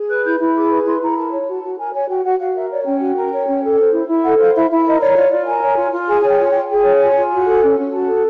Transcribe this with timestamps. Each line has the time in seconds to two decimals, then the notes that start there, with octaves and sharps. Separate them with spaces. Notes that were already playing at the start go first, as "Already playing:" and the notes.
Already playing: G#4
0.09 B4 F#6
0.24 E4 G6
0.39 E4
0.54 G#4 D6
0.70 B4 C#6
0.86 E4 C6
1.01 E4 A#5
1.16 A#4 A5
1.32 C#5
1.47 F#4 A5
1.62 F#4
1.78 A#4 G#5
1.93 C#5 G#5
2.09 F#4 G5
2.24 F#4 F#5
2.39 F#4 F5
2.55 A#4 E5
2.70 C#5 D5
2.85 C#4 G5
3.00 F#4
3.15 A#4
3.32 C#5
3.47 C#4
3.62 A4
3.78 C5
3.92 E4
4.08 E4
4.23 A4 F#5
4.39 C5 F5
4.55 E4 E5
4.70 E4 E5
4.85 A#4 D#5
5.00 C#5 D5
5.16 F4 D5
5.30 F4 D5
5.46 A#4 G#5
5.62 C#5
5.78 F4
5.92 F4
6.07 G#4 G#5
6.21 C#5 G#5
6.28 G5
6.38 F4 G#5
6.49 G5
6.55 F4
6.69 G#4 G5
6.85 C#5
6.99 F4 G#5
7.15 F4
7.31 F#4
7.46 A4
7.61 C#4
7.77 C#4
7.92 F#4 A5
8.07 A4